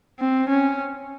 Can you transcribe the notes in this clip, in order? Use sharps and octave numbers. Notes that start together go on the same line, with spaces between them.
C4
C#4